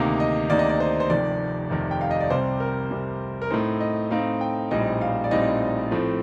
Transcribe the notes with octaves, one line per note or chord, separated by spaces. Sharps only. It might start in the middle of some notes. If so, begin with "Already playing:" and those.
Already playing: D2 C3 D#3 A#3 D#4
D#5
D2 C3 D#3 A#3 D#4 D5
D#5
D5
C5
C5
F1 F2 C3 D#3 D5
F1 F2 C3 D#3
G5
F5
D#5
D5
C2 C3 G3 C4 C5
A#4
C2 C3 G3 C4
A#4
A2 A3 C4 D#4 C5
D#5
A2 A3 C4 D#4 F5
G5
A#1 A2 G3 C4 D#4 D#5
F5
D5
A#1 A2 G3 C4 D#4 D#5
A2 F3 A3 C4